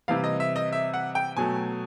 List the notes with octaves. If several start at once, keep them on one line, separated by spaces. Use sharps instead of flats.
C3 E3 G3 F5
D#5
E5
D#5
E5
F#5
G5
B2 F#3 A3 G#5